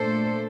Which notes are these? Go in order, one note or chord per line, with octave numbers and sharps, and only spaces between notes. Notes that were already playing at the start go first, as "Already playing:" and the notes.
Already playing: A#2 A3 D4 A4 C5